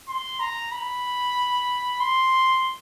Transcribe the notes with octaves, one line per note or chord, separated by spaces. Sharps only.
C6
A#5
B5
C6